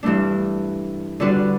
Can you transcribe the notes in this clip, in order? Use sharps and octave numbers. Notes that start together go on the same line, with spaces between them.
G2 E3 A3 D4
D3 G3 D4 F#4 B4